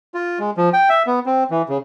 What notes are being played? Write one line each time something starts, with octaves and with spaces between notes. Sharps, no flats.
F4
G#3
F3
G5
E5
B3
C4
E3
C#3